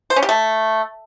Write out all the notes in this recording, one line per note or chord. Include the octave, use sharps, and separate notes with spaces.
C5
C#4
G4
A3